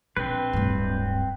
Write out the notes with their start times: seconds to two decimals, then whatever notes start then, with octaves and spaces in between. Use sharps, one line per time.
0.17 A#1 C4 B4
0.53 D1 G2